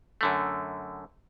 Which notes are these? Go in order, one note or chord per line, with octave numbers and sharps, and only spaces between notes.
F#2 D3 A3